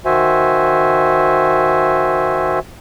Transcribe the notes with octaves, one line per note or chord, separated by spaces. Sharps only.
D#3 F#4 C5 E5 G#5